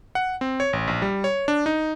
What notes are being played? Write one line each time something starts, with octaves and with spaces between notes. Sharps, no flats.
F#5
C4
C#5
A1
A#1
G3
C#5
D4
D#4